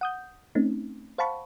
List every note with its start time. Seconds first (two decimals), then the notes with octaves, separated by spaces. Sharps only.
0.01 F#5 D#6 G6
0.55 A3 C4 C#4 D#4
1.18 C5 F5 F#5 A5 B5 C#6